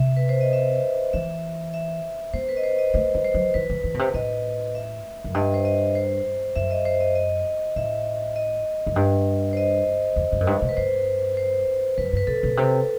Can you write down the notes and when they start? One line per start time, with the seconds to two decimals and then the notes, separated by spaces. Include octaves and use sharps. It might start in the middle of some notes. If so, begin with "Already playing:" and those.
Already playing: C3 E5
0.17 B4
0.29 C5
0.41 D#5
0.53 E5
1.13 E3 E5
1.74 E5
2.34 B3 C5
2.49 B4
2.57 D#5
2.64 C5
2.79 D#5
2.94 A3 D#5
3.15 G3
3.24 C5
3.34 F#3
3.54 E3 B4
3.70 E3
3.84 E3
3.94 B2
3.99 C3
4.14 A2 D#5
4.75 E5
5.24 F#2
5.34 G2 D#5
5.54 C5
5.65 D#5
5.95 C5
6.56 F#2 E5
6.71 D#5
6.85 C5
7.00 D#5
7.15 D#5
7.76 A2 E5
8.36 D#5
8.87 F#2
8.96 G2
9.53 C5
9.57 D#5
10.16 E2
10.32 G2
10.41 F#2
10.47 G2
10.62 B2
10.69 B4
10.77 G2 C5
11.37 C5
11.98 F#2 B4
12.13 G2 B4
12.27 B2 A4
12.43 B2
12.57 C3 A4